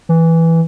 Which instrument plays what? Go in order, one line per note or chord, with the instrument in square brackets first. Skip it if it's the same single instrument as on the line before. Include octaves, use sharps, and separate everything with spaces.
[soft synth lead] E3